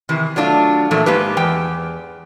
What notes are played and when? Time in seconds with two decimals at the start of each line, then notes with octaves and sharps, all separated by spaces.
0.09 C3 D#3 E3
0.36 F#3 A3 D4 F4
0.91 A#2 E3 F3 A3
1.06 G#2 A#3 G4 B4
1.37 E2 G5